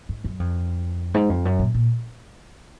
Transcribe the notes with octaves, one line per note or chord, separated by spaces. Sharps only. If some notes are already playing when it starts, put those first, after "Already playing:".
G#2
F#2
F2
G#2
F2
F#2
A#2
A#2